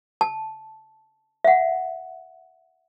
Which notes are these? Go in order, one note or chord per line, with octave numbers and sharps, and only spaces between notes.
A5
E5 F#5